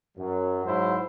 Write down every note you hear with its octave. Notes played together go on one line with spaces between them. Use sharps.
F#2 F#3
G#2 F#3 E4 C5